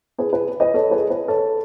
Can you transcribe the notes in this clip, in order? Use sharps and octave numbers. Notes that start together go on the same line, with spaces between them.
G#4 B4
G#4 B4
B4 D#5
A4 C#5
G#4 B4
G#4 B4
A4 C#5